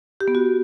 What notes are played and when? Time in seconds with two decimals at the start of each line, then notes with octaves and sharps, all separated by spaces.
0.21 G4
0.28 B3
0.35 F#4